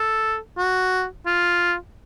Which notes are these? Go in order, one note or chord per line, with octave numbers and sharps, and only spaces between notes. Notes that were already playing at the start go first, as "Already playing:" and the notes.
Already playing: A4
F#4
F4